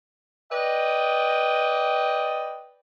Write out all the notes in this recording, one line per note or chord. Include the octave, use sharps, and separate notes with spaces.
B4 D5 D#5 G5